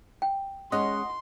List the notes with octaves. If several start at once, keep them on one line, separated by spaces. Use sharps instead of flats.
G5
G#3 C#4 D#5 F#5 C6